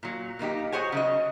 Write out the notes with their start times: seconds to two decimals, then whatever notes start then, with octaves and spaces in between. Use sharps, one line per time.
0.03 A#2 F#3
0.39 A#2 A#3 D#4 G4
0.72 F#4 G#4 C5 C#5 F#5 G#5
0.92 C#3 F#3 D#5